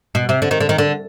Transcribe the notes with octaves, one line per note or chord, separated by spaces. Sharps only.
B2
C3
D3
D#3
D3
D#3
D3